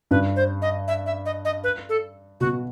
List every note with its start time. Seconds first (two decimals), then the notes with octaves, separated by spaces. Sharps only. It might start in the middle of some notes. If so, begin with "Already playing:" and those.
0.11 G2 B4
0.36 C5
0.62 D#5
0.88 E5
1.06 E5
1.26 D#5
1.45 D#5
1.64 B4
1.89 A4
2.40 B2 F#4